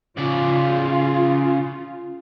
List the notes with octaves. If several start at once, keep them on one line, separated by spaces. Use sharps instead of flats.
C#3 F4 D5